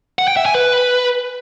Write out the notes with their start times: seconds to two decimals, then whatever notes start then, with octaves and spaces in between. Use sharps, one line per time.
0.19 F#5
0.28 G5
0.37 E5
0.46 G#5
0.55 B4